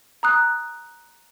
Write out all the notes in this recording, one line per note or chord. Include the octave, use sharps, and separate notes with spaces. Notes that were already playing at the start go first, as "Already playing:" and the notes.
A#5 D#6 F#6